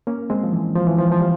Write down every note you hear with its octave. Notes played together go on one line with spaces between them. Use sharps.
A#3 C#4
G#3 C4
F3
E3
F3
E3
F3
F3
G3